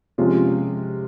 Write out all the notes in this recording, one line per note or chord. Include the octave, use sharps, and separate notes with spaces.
C3 F3 G#3 C#4 F4